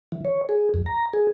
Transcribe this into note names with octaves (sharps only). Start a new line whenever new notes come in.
E3
C#5
G#4
F2
A#5
G#4